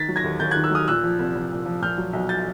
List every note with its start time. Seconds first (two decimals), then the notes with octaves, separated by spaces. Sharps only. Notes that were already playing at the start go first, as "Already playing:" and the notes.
Already playing: D#3 A6 B6
0.08 F#3
0.16 G#6 A#6
0.24 D#2
0.40 D#2 G6 A6
0.51 F#6 G#6
0.56 D#3
0.64 E6 F#6
0.71 F#3 D#6 F6
0.88 A#2 E6 F#6
1.03 F3
1.19 C2
1.35 C2
1.51 A#2
1.66 F3
1.81 A#2 F6 G6
1.98 F#3
2.13 B1
2.29 G6 A6